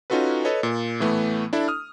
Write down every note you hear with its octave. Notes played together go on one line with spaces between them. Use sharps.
C#4 D#4 F4 F#4 A4 B4
A4 B4 C#5 D#5
A#2
A2 E3 A3 B3
D4 E4 A4
D#6 F6